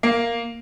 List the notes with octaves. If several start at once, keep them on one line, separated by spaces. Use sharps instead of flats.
A#3